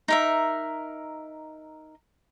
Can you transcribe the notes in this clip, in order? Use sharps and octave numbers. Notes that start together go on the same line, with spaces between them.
D#4 A#4 E5